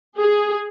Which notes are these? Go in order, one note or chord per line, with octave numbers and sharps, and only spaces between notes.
G#4